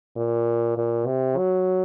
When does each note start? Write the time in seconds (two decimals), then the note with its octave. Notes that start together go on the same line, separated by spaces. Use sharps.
0.16 A#2
0.77 A#2
1.06 C3
1.37 F#3